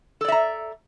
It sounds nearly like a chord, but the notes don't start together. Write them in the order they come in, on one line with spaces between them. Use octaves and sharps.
A4 D5 E5 A#5